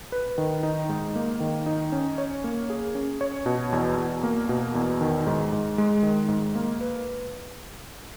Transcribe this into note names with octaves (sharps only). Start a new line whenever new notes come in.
B4
D#3
D#4
G#2
A#3
D#3
D#4
C#4
C#5
A#3
G#4
C#4
C#5
B2
E2
E2
A#3
B2
E2
D#3
G#2
G#2
G#3
D#3
G#2
A#3
B4